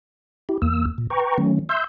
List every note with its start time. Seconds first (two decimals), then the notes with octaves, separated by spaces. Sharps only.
0.49 E4 G4
0.62 E2 A#3 E6
0.98 A#2
1.10 B4 G5 A#5 C#6
1.38 D#3 F#3 A3 C#4
1.69 E5 C6 E6 G6